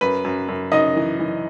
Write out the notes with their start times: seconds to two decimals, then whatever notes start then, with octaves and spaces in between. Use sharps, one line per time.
0.01 F#2 B4
0.25 F#2
0.48 F#2
0.72 F#2 D#4 D#5
0.96 E3
1.19 E3